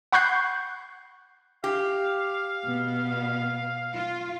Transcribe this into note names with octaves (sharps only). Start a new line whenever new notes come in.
F#5 B5 C#6 F#6 G6 C7
G4 F5
B2 B3
F4